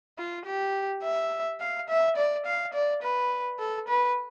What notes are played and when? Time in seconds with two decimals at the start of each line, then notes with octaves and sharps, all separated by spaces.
0.18 F4
0.46 G4
1.04 E5
1.60 F5
1.89 E5
2.17 D5
2.46 F5
2.74 D5
3.03 B4
3.59 A4
3.88 B4